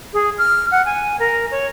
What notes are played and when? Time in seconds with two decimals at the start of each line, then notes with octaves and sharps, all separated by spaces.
0.14 G#4
0.38 F6
0.71 F#5
0.86 G#5
1.20 A#4
1.51 C#5